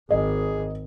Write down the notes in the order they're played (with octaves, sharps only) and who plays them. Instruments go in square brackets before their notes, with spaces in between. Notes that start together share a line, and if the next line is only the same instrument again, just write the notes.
[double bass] G#1 [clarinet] G#4 [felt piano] D#5